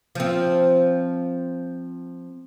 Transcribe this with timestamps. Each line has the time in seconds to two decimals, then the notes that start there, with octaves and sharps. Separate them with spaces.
0.15 F3 C4